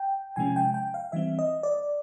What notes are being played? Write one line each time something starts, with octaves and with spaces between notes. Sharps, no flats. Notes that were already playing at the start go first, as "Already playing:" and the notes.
Already playing: G5
C3 F3 G#3 C#4 G#5
G5
G5
F5
E3 G3 C4 E5
D#5
D5